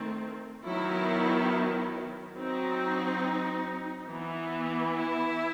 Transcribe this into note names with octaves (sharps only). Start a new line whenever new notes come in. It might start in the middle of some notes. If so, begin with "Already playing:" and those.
Already playing: D#3 A3 C4
D#3 F#3 B3 E4
F#3 C4 D#4
E3 B3
E4